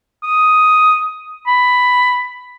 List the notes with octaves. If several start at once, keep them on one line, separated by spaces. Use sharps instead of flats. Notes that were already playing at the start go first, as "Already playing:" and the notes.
D#6
B5